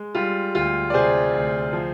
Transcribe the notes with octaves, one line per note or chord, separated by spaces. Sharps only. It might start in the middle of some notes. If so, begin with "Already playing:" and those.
Already playing: G#3
G3 F4
D2 F4
D5
C3 G#4 C5
D2
F3